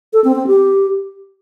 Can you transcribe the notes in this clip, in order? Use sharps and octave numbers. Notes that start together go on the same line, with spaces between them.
A4
C4
C4
G4